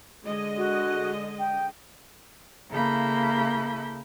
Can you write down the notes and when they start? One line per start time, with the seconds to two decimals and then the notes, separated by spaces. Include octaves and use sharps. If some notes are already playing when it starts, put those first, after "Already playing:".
0.24 D3 G#3 D#5
0.57 F#4
1.39 G5
2.72 C#3 A#3 E4 A4 B5 G6